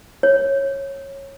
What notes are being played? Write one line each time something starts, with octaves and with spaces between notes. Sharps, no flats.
C#5